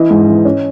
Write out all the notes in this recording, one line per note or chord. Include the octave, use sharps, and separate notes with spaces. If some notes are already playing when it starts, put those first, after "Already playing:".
Already playing: E3 E4 D#5
G#2
E3
C#4